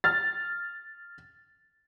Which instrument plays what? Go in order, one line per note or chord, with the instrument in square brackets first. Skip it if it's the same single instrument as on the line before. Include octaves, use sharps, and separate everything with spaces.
[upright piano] F6 A6